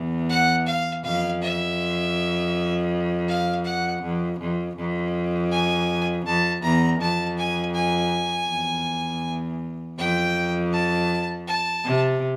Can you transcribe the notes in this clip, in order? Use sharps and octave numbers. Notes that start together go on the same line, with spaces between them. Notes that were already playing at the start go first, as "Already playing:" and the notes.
Already playing: E2
F#5
F5
F2 F5
E5
F5
F#5
F2
F2
F2
G#5
F2 A5
E2 A#5
F2 A5
G#5
G#5
E2
F2 G5
A5
A5
C3